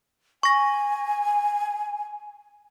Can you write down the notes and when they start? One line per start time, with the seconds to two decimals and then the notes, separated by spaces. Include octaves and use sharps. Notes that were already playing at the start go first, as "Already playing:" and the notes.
0.43 G#5 C#6 A#6